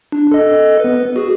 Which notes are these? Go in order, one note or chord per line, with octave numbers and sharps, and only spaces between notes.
D4
A4 D#5
B3 B4
F#4 G#4